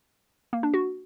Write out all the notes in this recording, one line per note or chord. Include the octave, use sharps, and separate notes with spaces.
A#3
D4
F#4